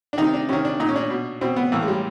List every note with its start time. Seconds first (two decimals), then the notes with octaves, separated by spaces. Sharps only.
0.13 D4
0.18 C3 D#3 D#4
0.34 D4
0.49 C3 D#3 C#4
0.65 D4
0.80 A#2 D#4
0.89 C#4
0.96 D4
1.10 B2
1.41 B2 C4
1.56 B3
1.72 A2 E3 A#3
1.82 G#3
1.88 G3